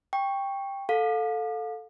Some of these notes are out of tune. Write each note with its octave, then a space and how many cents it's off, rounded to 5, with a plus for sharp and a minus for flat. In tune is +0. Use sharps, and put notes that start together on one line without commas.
G5 +10 C#6 +0
A4 +0 F5 +30